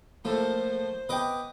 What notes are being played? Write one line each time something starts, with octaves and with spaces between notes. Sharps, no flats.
A2 F3 A#3 A4 C5
B3 B4 D#5 G5 D6